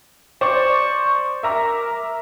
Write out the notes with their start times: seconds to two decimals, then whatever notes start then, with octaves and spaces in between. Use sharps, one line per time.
0.41 C5 D5 C#6 D6
1.43 A#4 E5 A#5 D6